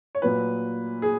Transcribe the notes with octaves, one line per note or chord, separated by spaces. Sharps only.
C#5
A#2 F#3 B4
G#4